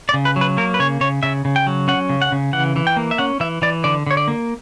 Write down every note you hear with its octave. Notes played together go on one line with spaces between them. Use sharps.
D5
C#3
B4
F#3
B4
A#3 A#4
B4
C#3 C#5
C#3 C#5
C#3 E5
C#3
G5
F#3
C#4 F#5
C#3
F#5
C#3
E3 F#5
E3
G5
A#3
E5
C#4 F#5
E3 E5
E3 D5
D3 D5
D3 C#5
D5
A#3